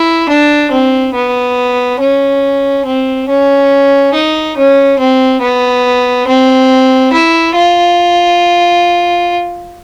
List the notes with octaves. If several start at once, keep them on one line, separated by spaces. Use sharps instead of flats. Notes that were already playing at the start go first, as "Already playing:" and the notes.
Already playing: E4
D4
C4
B3
C#4
C4
C#4
D#4
C#4
C4
B3
C4
E4
F4